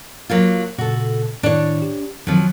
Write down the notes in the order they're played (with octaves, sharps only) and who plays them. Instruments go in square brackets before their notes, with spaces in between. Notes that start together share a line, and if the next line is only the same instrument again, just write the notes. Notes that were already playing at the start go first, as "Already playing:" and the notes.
[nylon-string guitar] F#3 A#3 F4
[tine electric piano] A#2 C#3 [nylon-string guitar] F#4 A4
[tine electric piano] A2 D#3 E4 [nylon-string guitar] D4 C#5
[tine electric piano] G4
[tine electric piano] D3 D#3 C4 [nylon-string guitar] F3 F#3